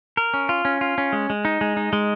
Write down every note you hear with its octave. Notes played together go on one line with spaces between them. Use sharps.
A#4
C#4
F4
C#4
F4
C#4
G#3
G#3
D#4
G#3
D#4
G#3